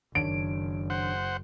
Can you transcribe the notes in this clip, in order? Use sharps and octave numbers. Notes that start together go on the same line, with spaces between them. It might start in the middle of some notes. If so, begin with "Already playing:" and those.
F#1 D#3 D4 C#5 D7
C5 F#5